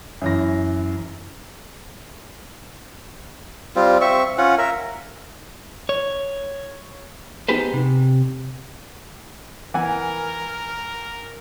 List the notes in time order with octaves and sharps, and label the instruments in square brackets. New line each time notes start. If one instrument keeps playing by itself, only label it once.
[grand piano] F#2 E3 A#6
[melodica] G3 C4 F4
C4 E5 C#6
C#4 F4 F#5
A#4 E5
[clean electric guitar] C#5
B3 D#4 G4 G#4 B4 C5
C3
[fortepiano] E3 F#5 G#5 [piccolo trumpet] A#4